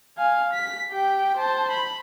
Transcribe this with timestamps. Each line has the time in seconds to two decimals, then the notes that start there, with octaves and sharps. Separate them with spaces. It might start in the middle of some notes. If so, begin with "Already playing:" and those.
0.18 F5 G#5
0.53 B6
0.91 G4 G5
1.37 C5 A5
1.71 B5